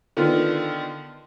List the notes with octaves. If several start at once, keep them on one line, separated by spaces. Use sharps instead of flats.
D3 D#3 B3 F4